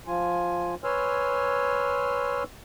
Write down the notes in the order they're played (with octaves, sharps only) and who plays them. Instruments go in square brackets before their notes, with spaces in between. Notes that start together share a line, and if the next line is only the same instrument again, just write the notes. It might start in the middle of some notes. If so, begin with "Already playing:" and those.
[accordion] F3 F4 G#5
B4 C#5 G#5 C6 E6 F6